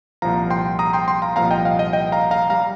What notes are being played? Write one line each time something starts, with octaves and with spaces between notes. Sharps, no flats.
C2 A#2 F3 F5 A#5
G5 C6
A#5 D#6
G5 C6
G5 C6
F5 A#5
C2 A#2 F3 F5 A#5
D#5 G5
F5
D#5
D#5 G5
F5 A#5
F5 A#5
G3 F5 A#5